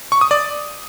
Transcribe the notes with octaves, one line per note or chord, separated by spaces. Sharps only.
C#6
D#6
D5